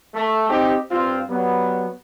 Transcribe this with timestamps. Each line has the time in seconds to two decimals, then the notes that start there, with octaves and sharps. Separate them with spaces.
0.15 A3
0.50 C4 D#4 G4
0.91 G2 C4 F4
1.29 F#3 G3 B3